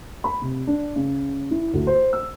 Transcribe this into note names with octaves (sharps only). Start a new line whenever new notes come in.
B5
C3
D4
C#3
E4
D2
C5
E6